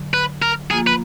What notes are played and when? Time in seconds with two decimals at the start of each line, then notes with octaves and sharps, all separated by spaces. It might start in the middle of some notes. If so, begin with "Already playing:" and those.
Already playing: D3 F#3
0.14 B4
0.42 A#4
0.70 F3 A#3 F4 G#4
0.87 B4